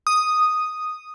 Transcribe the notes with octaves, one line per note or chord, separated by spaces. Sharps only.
D#6